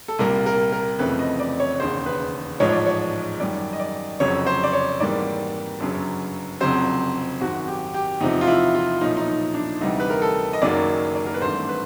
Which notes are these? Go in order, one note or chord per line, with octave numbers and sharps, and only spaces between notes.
A4
C2 A#2 G3 A#3 A#4
A#4
A#4
F1 F2 C#3 E3 A3 B4
D#5
D5
C#5
E1 D#2 C#3 C5
B4
A1 G#2 F3 G#3 C#5
D5
C#5
F#2 D#3 G3 D5
D#5
D5
F1 F2 C#3 F#3 C#5
C5
D5
C#5
G#1 G#2 E3 G3 A#3 D5
G1 F#2 C#3 F#3
F1 F2 C#3 F#3 C5
G#1 F#2 D#3 F#4
G4
G4
E2 C3 F3 D#4
F4
E4
F4
B1 A#2 F3 D#4
E4
D#4
D#4
D4
D2 C3 E3 G3 D#4
B4
A#4
A4
D#5
F#1 F#2 D#3 F#3 A#3 D5
D5
A#4
B4
G#1 G2 E3 A3 C5
B4